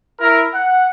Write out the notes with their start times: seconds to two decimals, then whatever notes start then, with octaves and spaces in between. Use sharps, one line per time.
0.21 E4 A#4
0.54 F#5